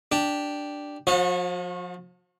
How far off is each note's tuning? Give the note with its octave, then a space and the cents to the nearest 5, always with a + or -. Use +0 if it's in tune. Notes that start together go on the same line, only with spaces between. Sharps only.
D4 +0 G4 +0
F3 +30 F#4 -35 C#5 -25